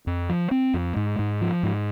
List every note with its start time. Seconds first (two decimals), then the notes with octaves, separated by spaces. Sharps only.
0.07 F2
0.29 F3
0.51 C4
0.74 F2
0.96 G#2
1.19 G#2
1.41 F3
1.63 G#2